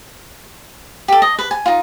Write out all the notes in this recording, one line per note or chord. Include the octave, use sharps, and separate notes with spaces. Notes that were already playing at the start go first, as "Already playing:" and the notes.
G4 A4
D#5
B4
G#5
D#4 F4